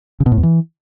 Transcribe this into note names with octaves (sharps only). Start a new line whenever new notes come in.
C#3
B2
A2
E2
E3